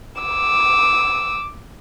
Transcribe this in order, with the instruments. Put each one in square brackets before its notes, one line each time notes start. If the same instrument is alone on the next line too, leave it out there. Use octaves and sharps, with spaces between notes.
[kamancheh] D6 E6